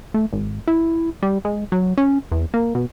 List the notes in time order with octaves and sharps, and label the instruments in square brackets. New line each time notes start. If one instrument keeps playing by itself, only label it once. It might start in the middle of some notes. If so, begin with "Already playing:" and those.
[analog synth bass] A3
G#1
E4
G3
G#3
F#3
C#4
E2
A#3
B2